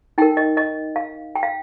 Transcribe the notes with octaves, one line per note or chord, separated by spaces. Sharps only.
D#4 A#4 G5
D#5
D#5
F5
G5
F5